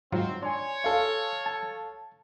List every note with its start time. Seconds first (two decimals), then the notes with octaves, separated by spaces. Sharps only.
0.12 G#2 F#3 C4 F4
0.43 D4 C#5 G#5 C6
0.84 A4 F5
1.46 A5